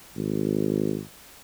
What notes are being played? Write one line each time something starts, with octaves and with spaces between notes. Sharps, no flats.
G#1